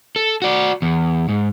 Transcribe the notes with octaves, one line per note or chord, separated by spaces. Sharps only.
A4
F#4 D5
E2
G#2